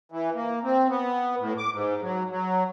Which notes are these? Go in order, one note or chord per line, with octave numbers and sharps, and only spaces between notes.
E3
A#3
C4
B3
A2
D6
G#2
F#3
F#3